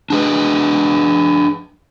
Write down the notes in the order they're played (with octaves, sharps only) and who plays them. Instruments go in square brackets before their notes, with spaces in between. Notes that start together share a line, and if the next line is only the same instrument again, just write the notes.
[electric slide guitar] D4 G#4 B4